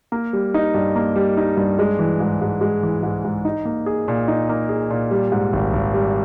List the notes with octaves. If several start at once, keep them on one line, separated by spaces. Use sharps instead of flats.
A#3
G3
D#4
G2
A#3
G3
D#4
G2
G#3
E3
G#2
G#2
G#3
E3
G#2
G#2
D#4
A#3
G#4
A#2
D#4
A#3
G#4
A#2
G3
G#2
G#1
G#1
G3